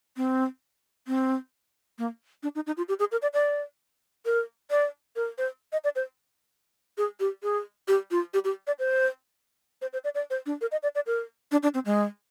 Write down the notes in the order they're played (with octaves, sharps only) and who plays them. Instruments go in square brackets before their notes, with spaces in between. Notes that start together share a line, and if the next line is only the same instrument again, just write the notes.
[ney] C4
C4
A#3
D4
D#4
D#4
F4
G4
G#4
A#4
D5
D5
A#4
D5
A#4
C5
D#5
D5
C5
G#4
G4
G#4
G4
F4
G4
G4
D5
C5
C5
C5
D5
D5
C5
D4
A#4
D#5
D5
D5
A#4
D4
D4
C4
G#3